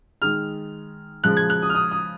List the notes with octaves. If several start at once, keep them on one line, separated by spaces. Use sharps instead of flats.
D#3 G#3 F6
C#3 F3 G#3 F#6
G#6
F#6
D#6
F6
D#6
D#6